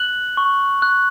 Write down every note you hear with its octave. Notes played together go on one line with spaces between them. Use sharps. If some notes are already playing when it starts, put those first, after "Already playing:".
Already playing: F#6 F#7
C#6
F#6